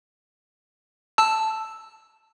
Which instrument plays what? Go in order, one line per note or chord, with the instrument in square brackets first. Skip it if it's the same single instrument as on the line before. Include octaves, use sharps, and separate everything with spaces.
[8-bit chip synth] A5 E6